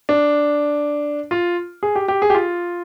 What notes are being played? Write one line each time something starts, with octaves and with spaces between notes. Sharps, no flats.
D4
F4
G#4
G4
G4
G#4
G4
F4